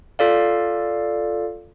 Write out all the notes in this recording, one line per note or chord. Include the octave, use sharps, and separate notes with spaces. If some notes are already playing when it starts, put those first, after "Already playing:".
F4 A4 D5 F5